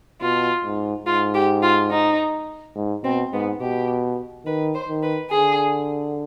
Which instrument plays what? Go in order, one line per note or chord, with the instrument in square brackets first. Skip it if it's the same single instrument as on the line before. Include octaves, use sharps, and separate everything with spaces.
[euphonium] B2 [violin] F4
[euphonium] G#2
[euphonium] G#2 [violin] F4
[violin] G4
F4
D#4
[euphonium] G#2
[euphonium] B2 [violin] C4
[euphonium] G#2 [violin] B3
[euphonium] B2 [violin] G4
[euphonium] D#3 [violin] B4
[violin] C5
[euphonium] D#3
[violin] B4
[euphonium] D3 [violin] G#4